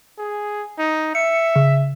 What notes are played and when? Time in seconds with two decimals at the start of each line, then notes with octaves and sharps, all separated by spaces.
0.19 G#4
0.79 D#4
1.15 E5 C#7
1.56 C#3